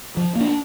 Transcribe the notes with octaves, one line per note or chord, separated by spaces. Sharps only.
F3
A#3
D4